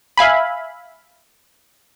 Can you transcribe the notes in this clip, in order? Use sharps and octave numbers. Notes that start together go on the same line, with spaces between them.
E5 F5 G#5 B5